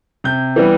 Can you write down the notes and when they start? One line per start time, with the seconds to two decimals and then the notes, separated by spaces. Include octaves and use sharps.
0.24 C3 G6
0.56 E3 G3 B3